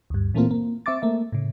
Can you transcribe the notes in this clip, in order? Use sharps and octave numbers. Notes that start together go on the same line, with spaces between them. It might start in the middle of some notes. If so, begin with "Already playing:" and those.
D2 G2
A#2 E3 A3 A#3 C4 F4
A#3
C4 E5 C#6 D6 A6
A3 A#3 E5
A2 C#3